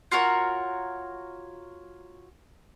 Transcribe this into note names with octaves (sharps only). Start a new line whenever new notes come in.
F4 F#4 A#4 C#5